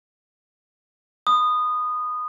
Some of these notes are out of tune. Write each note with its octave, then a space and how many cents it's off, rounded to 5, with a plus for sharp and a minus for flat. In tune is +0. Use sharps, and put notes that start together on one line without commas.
B5 +30 D#6 -15